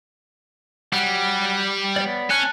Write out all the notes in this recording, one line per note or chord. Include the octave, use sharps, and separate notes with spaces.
F#3 G3 F#5
B3 C#5 D5
C#4 A5 F#6